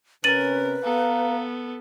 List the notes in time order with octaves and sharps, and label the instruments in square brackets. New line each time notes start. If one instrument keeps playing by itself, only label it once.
[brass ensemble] C3 C#4 [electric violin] A#4 [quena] B4 [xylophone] A6 D#7 F#7
[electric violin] B3 A4 [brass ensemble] F5 A#5